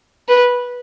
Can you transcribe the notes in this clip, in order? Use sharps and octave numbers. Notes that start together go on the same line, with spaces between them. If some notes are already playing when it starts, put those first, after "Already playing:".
B4